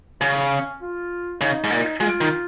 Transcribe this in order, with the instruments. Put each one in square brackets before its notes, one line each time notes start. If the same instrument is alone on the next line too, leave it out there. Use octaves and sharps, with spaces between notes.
[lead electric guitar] C#3 [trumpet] C#4
[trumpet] F4
[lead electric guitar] C#3 [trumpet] D#4
[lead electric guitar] G#2
A#2
[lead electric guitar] G#3 [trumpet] F4
[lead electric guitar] D#3